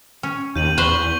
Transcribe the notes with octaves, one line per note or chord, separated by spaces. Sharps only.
C#4
D#2 G6 D#7 F#7
E2 B4 C5 C#6 F#7 G7